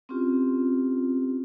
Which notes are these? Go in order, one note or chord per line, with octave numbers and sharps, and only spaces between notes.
C4 C#4 E4 F4 G4